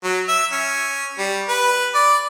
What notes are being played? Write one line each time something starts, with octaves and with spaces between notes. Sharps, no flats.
F#3
E5
C#4
G3
B4
D5